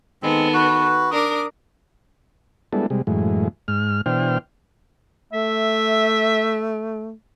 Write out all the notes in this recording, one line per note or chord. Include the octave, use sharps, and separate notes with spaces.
D#3 G#3 B3 C4 A4
F#4 B4
D4 A#4 D6 D#6
G3 G#3 B3 D4 E4 A4
C3 G3 G#3
F#2 A2 E3 G#3
G#2 F6
B2 E3 D4 C5 G5 F6
A3 E5